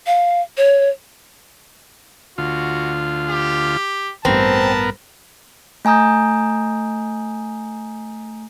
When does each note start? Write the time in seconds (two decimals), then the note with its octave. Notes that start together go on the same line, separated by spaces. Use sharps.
0.07 F5
0.57 C#5
2.38 D2 F4 F#4
3.30 G4
4.25 A1 G2 B3 C4 A#4 A5
5.85 A3 G#5 A#5 D#6 G6